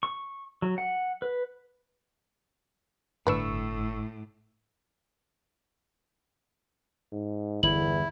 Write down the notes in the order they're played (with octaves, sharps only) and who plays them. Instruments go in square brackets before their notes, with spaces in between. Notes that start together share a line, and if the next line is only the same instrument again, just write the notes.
[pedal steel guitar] C#6
F#3
F#5
B4
[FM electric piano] G1 C#6 E6 [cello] A2 [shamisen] D4 B4
[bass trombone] G#2
[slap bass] G1 [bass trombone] E2 [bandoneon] E4 [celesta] F#7